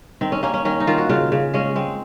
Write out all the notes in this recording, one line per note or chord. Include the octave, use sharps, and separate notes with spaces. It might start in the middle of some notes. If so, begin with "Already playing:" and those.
D#3 C4
C#4
A#3 C#4
C#4
D#3 C#4
D#4
D#3 F4
F#4
C#3 F4
C#3
G#3 C#4
G#3 C4